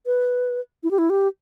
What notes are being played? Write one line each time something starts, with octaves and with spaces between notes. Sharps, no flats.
B4
E4
G4
E4
G4